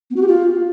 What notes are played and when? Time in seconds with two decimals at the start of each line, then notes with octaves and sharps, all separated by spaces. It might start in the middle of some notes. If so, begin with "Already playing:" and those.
0.10 B3
0.16 F#4
0.22 G4
0.28 F4